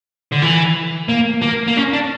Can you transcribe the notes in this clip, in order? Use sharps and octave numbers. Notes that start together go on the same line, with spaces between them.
D3
E3
A#3
A#3
A#3
C#4
D4